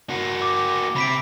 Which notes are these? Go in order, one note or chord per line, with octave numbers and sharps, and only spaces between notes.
A#3 F#4
D6 A#6
C3 B5 B6 D7